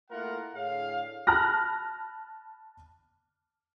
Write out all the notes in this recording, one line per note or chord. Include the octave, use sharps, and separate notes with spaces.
A3 A#3 E4 F4 A#4 F#5
A2 D3 G#4 F5
A5 B5 F6 F#6 A#6